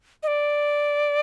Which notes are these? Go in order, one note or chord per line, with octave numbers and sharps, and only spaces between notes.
D#5
D5